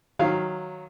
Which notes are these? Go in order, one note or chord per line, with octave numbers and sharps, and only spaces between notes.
D#3 F#3 F5